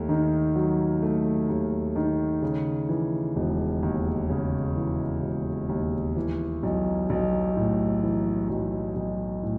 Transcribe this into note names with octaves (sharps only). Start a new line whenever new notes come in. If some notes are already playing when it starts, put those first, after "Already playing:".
Already playing: D#2 A3
D#3
F#3
A3
D#2
D#3
C#3
E3
E1
D#2
C#3
E3
E1
D#2
E3
B1
B1
A2
E3
B1
B1
A2